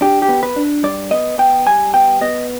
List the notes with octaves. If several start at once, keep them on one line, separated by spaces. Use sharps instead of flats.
D4 G4
G4
B3
B4
D4
G2 D5
B3 D#5
B3 G5
G3 G#5
B3 G5
B3 D#5